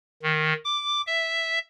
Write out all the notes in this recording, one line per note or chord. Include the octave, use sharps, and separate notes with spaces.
D#3
D6
E5